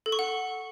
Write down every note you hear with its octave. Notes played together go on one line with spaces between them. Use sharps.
A4
C#6
F#5